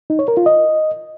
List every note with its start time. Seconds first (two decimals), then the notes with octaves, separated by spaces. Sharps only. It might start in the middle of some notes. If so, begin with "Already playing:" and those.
0.10 D#4
0.19 C#5
0.28 A#4
0.37 F4
0.46 D#5